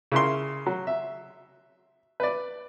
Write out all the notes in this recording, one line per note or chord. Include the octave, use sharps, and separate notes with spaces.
C#3 E4 A#4 C6
F#3
E5
B4 D5